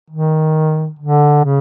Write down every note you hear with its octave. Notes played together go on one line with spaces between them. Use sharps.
D#3
D3
C#3